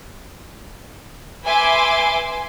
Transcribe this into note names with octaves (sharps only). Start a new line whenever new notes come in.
B4 E5 G#5 C6 D6